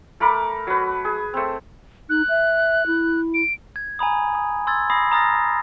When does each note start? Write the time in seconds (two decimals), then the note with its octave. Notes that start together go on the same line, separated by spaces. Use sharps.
0.20 A3 A#4 B5 D6
0.67 F#3 B4
1.05 G#4
1.34 A3 C4
2.10 D#4 F#6
2.29 E5
2.87 E4
3.34 D7
3.76 G#6
3.99 G#5 A#5 B5 D#6
4.35 D#6
4.67 C6 E6 G#6 A6
4.90 B5 D#6 A#6 C7
5.12 A#5 D#6 F6 A6 A#6